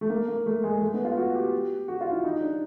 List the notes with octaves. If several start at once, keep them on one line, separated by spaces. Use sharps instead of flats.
A3
A#3
A#3
A3
G#3
A3
B3
F4
F#4
G4
F#4
F4
E4
D#4
D4